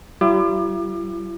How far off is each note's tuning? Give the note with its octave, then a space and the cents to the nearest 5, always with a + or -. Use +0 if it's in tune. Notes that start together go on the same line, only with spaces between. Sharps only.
G3 -40 E4 +45 D6 +35